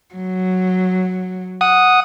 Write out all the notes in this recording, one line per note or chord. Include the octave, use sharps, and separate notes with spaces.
F#3
F#5 D#6